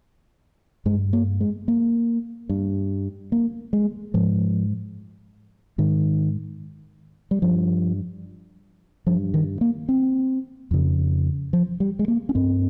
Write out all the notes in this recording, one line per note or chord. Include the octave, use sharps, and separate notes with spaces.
G2 G#3
A#3
G#3
A#3
G2
A#3
G#3
G#2 F3
G#2 D#3
G3
G2 F3
G2 F3
D#3
A#3
C4
F2 C#3
F3
G3
G#3
A#3
C#4
G2 C4